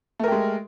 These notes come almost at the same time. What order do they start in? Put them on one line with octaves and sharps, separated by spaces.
A3 A#4 G4 G#3